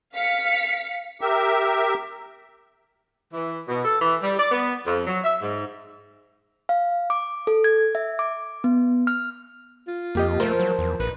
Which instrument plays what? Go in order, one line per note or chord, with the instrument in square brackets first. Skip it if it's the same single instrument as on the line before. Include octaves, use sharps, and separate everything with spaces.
[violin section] F5 B6 C#7
[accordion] G4 A#4 E5
[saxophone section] E3
B2
A4
E3
G3
D5
B3
F2
F#3
E5
G#2
[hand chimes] F5
D6
A4
G#6
E5
D6
B3
F6
[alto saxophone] F4
[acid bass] F2 [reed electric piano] A#3 G4 D#5
[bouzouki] F3 C5 [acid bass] A3 [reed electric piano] A#4
[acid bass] F#3
E2
[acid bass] A#1 [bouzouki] D#4 [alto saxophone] B4